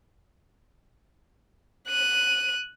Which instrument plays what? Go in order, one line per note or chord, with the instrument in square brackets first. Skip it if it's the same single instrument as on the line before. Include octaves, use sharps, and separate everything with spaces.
[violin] F#6 D#7